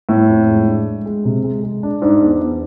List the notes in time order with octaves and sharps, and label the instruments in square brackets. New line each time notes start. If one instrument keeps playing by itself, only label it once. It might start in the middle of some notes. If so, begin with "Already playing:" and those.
[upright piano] A2 [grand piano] B3
[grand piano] F2
G#3
D4
G#3
G#3
C3
G#3
G#3
D4
[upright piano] G#2 [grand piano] D4
[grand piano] E2
E2